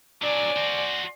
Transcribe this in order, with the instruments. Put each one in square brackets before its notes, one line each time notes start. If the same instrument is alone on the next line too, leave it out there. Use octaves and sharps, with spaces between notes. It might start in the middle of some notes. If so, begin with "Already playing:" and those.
[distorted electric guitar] F#3 D4 [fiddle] D5 G#5
[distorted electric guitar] F#4 C5